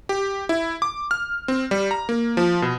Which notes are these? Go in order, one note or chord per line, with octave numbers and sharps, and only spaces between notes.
G4
E4
D6
F6
C4
G3
A#5
A#3
F3
B2